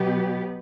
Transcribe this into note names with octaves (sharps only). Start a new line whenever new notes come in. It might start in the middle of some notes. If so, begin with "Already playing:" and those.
Already playing: B2 F#3 B3 G4